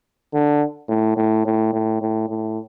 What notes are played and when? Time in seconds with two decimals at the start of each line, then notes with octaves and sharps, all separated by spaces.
0.34 D3
0.89 A2
1.17 A2
1.46 A2
1.73 A2
2.01 A2
2.29 A2